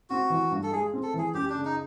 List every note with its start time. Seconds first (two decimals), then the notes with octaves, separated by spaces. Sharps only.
0.10 C4 F#4
0.30 E3
0.51 G2
0.63 A4
0.72 G#3 G#4
0.93 C4
1.03 A4
1.14 E3 G#4
1.34 F#2 G4
1.50 D4
1.55 C#3
1.65 D#4